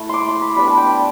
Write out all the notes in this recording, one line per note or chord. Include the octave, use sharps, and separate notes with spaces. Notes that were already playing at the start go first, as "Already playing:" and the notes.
Already playing: A3 E4
C6 D6
C6
B5
G3 B3 D4 B5
A5
G5
G5